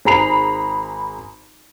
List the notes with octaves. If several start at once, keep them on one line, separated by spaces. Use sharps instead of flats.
G#1 G#4 A#5 B5 C7 F7